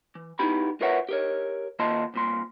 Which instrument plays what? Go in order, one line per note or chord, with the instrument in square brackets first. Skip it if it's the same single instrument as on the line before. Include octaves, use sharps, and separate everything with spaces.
[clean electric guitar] E3
B3 D#4 E4 G4 B5
F4 A#4 B4 C#5 E5 F#5
G4 A#4 C#5
D#3 A#3 F4 D#5 A5 C6
C2 A#2 C6